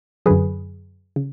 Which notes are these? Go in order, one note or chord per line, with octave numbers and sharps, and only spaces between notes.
F#2 D3 F#3 G#4 B4
C#3